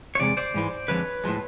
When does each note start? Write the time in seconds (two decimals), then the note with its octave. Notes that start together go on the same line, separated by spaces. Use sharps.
0.15 C#5
0.19 E2 C3 G#3 D5
0.37 C5 D5
0.54 G#2 E3 G#3
0.88 F2 D3 F3 G#3 B4 C#5
1.24 A2 F3 G#3